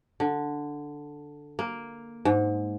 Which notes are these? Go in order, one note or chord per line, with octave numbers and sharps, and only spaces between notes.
D3
A#3
G#2